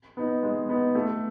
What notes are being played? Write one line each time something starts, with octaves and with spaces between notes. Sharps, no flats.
B3 D#4
G#3
B3 D#4
A3